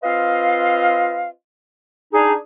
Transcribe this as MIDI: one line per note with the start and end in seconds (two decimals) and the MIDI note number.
0.04 1.30 60
0.04 1.30 65
0.04 1.30 71
0.04 1.30 75
0.04 1.30 77
2.14 2.34 62
2.14 2.34 63
2.14 2.34 68